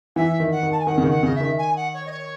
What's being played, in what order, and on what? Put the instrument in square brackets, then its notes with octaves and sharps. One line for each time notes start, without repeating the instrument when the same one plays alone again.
[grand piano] E3 [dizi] E5
[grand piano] D#3
[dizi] F#5
[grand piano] D#3
[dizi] A5
G#5
[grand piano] D#3 [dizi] F#5
[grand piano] C#3
D#3
[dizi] F#5
[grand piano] C#3 [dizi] D#5
[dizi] E5
[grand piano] D#3
[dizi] G#5
F#5
C#5
D#5
C#5